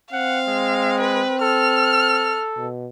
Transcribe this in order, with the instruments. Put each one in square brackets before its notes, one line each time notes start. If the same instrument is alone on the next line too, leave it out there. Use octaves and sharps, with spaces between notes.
[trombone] C4 [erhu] F5 [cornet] F#5
[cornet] G#3
[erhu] B4
[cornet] A4 [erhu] F6
[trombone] B2